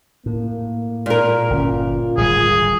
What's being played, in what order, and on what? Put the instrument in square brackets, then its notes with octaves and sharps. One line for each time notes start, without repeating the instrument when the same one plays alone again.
[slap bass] A2 [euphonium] A#3
[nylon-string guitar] A#2 A#4
[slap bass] G1 C#4 [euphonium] F4
[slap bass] D1 G#1 G3 [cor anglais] G#4